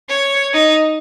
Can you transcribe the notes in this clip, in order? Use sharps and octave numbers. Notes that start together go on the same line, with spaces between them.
C#5
D#4